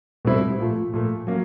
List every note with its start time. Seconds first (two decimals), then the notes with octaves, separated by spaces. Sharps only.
0.25 B2 G3 C4 E4
0.59 A#2 F3 A3
0.93 A#2 F3 A3
1.27 F#3 A#3 C#4